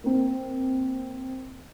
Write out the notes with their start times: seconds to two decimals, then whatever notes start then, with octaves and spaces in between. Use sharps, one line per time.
0.04 A#3 C4